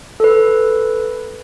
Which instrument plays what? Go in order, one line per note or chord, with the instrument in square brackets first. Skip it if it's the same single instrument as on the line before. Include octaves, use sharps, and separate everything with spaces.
[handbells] A4 B4